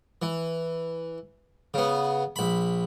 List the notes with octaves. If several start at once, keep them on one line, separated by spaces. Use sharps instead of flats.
E3
C#3 B3
A#1 B5